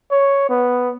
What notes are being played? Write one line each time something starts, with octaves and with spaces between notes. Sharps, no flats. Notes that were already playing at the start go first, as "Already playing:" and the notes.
C#5
B3